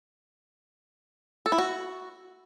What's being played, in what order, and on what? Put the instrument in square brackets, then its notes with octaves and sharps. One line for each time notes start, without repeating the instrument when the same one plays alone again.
[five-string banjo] A4
E4
F#4